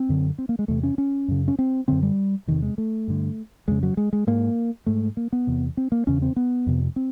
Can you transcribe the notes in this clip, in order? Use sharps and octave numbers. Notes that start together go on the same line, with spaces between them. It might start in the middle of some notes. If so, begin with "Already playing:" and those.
Already playing: C4
F#2 D3
C4
A#3
G#3
E2 C3 A3
C#4
C#4
F#2 C#3
C#4
C4
F#2 D3 C4
G3
E2 C3 D#3
G#3
A3
G2 D3
F2 C#3 G#3
F#3
G#3
G#3
G#2 A#3
G#2 A3
A#3
B3
E2 C3
C4
A#3
E2 C#3 C#4
C4
B3
F2 C3
C4